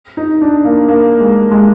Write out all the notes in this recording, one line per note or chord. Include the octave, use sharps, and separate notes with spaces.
D#4
D4
A#3
A#3
G#3
G#3